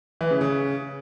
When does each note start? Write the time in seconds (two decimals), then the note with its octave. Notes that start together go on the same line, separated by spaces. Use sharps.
0.21 E3
0.31 C#3
0.41 C#3